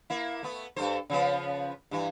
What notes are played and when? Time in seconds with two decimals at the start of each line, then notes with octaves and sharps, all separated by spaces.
0.10 A#3 E4
0.43 A3 B3
0.76 G2 A4 C5
1.10 C#3 F3 B3
1.91 G2 E3